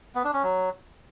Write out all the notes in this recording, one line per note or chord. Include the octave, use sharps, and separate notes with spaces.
B3
D4
C#4
F#3